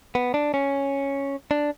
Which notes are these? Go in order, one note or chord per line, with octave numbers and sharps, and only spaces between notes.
B3
D4
C#4
D4